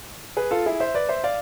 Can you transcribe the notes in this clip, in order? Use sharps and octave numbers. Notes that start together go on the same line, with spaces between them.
G#4 B4
F4 A4
E4 G#4
C5 E5
B4 D5
C5 E5
D5 F5